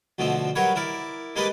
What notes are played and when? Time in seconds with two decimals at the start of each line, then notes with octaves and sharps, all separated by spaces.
0.18 D2 B2 D3 F3 C4
0.55 F#3 G3 F#4 A#4 B4 C#5
0.75 E4 A#4 D5
1.36 G#3 A#3 G4 B4 D5 D#5